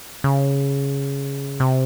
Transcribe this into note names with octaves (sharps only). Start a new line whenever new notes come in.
C#3
C3